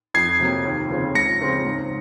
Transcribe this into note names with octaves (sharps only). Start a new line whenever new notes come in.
F2 G#6 C7
C3 F#3 A#3
D#2
C#3 F3 C4
C#2 A#6 C#7
C#3 F3 C4 F4
G#2